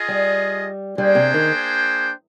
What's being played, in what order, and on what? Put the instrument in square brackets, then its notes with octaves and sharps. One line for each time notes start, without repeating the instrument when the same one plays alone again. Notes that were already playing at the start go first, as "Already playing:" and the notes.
Already playing: [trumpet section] F4 G#4 D#5
[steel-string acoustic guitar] G3
[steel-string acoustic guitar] G3 [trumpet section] A#3 D4 G#4 C5 G5
[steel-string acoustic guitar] C3
D#3